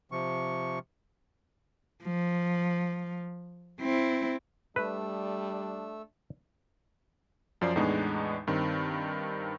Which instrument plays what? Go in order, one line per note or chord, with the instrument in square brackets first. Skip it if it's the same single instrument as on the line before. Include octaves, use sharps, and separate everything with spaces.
[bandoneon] C3 F3 C#6
[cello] F3
C4 E4
[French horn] G3 [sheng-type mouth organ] A3 E6 [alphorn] D4 [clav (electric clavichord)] B4
[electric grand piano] F#2 F3 D5 C7
E2 A2 G#3 B3 D4 D#4
G2 D#3 C4